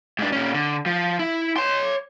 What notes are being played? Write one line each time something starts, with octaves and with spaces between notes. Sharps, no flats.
G#2 D4
A#2 C#4
D3
F3
E4
C#5 C6